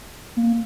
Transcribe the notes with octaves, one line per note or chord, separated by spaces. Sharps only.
A#3